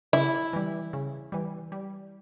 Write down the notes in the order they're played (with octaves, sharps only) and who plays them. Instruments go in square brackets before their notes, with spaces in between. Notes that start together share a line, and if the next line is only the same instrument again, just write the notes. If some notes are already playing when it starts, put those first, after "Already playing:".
[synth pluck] C#3 [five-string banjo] E4
[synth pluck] E3 G3
C#3
E3 G3
G3